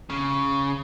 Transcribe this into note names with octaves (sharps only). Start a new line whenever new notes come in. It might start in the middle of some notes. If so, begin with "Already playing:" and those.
C#3